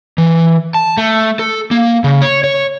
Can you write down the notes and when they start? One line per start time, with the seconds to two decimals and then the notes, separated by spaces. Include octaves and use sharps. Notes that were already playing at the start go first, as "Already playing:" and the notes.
0.18 E3
0.74 A5
0.97 A3
1.39 A4
1.71 A#3
2.04 C#3
2.22 C#5
2.44 C#5